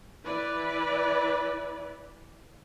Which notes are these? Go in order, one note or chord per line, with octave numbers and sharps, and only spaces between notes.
E3 E4 B4 D5